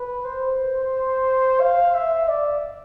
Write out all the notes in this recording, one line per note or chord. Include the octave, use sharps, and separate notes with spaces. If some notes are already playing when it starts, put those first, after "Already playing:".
Already playing: B4
C5
F5
E5
D5